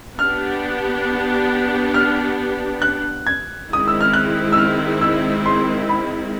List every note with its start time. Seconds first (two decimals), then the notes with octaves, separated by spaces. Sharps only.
0.19 B3 D4 G4 F6
1.94 F6
2.82 F#6
3.27 G#6
3.70 D#3 G#3 C4 E4 D#6
3.88 E6
4.01 F6
4.13 F#6
4.52 E6
4.58 F6
5.01 E6
5.46 C6
5.89 B5